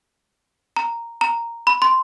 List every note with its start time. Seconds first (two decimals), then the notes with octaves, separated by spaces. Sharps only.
0.77 A#5
1.21 A#5
1.67 B5
1.82 C6